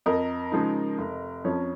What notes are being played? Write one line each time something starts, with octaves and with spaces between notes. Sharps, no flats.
F2 A#4 D#5
C#3 F3 G#3 D#4
F1
F2 F3 C#4